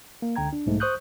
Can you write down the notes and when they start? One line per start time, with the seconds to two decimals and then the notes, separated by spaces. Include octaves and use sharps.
0.22 A#3
0.36 C#2 D3 G5 A#5 G#6
0.53 D4
0.66 B1 G#2 A3
0.80 C5 C#6 D#6 F#6 G6